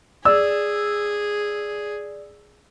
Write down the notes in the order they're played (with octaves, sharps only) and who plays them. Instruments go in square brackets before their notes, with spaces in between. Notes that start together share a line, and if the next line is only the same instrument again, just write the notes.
[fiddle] G#4 [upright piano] D5 E6